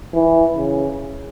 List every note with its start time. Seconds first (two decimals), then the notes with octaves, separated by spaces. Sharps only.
0.14 E3
0.57 C#3